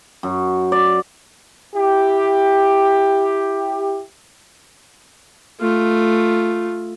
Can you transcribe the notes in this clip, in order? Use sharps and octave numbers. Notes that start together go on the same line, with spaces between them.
F#2
D5
E4 G4
A3 F4